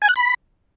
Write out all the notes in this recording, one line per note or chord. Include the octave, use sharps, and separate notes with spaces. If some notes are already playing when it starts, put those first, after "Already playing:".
G#5
F#6
B5